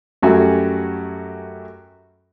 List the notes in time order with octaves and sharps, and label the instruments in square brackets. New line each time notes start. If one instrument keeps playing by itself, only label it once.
[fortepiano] F#2 G3 A3 F#4 G#5